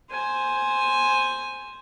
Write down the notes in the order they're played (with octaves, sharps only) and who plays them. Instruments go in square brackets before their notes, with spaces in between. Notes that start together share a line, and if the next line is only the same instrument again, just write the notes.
[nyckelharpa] C5 G#5